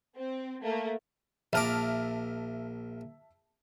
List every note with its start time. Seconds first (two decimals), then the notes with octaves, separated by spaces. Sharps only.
0.15 C4
0.62 A3 A#3
1.53 A#1 A#4 E5 A5 D6 F6